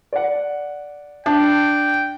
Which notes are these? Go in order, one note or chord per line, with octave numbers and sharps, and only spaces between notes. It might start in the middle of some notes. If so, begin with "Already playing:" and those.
D5 F#5
D4 G5 A5